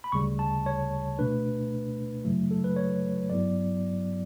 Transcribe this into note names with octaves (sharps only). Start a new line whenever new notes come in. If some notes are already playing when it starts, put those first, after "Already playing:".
B5
D2 C#3 G3 C#6
A5
C#5
B2 A3 D4 B4
F#2 C#3 F#3 A3 E4
A4
B4
C#5
G2 F#3 B3 E4 D5